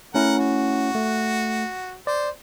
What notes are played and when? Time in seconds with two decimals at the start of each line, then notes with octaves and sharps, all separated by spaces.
0.14 A3 C#4 E4 A#4 F#5
0.38 F#4
0.95 A3
2.07 C5 D5